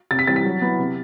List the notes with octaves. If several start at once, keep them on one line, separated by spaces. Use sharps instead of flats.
C3 A6
B6
E3 G3 C4 A6
B6
F#3
B3 E4
C3